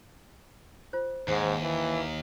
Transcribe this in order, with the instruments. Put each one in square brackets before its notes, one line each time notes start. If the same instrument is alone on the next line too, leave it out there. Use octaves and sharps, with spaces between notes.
[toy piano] F4 C5
[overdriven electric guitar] D#2 [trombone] G#2 [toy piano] C5 F#5
[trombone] E3